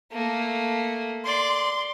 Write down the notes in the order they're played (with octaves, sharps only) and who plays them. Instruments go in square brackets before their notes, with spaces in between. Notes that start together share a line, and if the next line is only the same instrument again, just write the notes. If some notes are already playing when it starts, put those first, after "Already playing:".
[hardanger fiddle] A3 A#3
[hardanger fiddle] D5 [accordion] C6